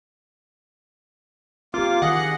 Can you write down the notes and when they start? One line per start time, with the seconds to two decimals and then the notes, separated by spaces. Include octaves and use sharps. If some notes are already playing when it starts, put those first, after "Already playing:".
1.74 A#3 C4 F4 G4 D6
2.02 D#3 E3 G#4 D#5 F#5